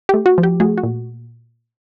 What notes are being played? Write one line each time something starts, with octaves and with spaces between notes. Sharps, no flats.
A3 G4
F#4
F3
G4
A3 F#4 G#4
F#4
A#2